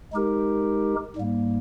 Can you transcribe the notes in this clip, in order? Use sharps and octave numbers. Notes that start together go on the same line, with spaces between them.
G#3 D#4 G4 A#4
G#2 G3 A#3